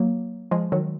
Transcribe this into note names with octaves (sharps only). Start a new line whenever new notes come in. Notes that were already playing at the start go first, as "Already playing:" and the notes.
Already playing: F#3 A#3
F3 G#3
D#3 F#3